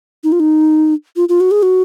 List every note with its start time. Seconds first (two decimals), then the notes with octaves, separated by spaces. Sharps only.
0.24 D#4
0.32 F4
0.40 D#4
1.16 F4
1.29 F4
1.40 F#4
1.51 G#4
1.63 F#4